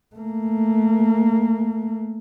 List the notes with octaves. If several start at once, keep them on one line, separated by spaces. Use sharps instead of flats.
A3 A#3